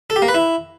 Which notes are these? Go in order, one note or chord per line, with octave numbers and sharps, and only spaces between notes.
A4
G4
A#3
B4
E4